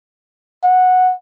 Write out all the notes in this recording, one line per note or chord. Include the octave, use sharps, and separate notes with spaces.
F#5